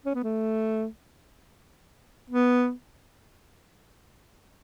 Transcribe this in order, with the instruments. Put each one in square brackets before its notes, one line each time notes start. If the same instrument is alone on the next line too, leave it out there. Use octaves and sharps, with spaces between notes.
[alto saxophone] C#4
B3
A3
B3